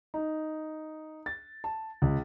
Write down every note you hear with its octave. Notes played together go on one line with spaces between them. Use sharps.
D#4
A6
A5
C#2